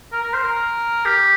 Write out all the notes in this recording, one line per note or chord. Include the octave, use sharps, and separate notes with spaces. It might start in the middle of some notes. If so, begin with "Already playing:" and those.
A#4
A#4
C5
A#4
G4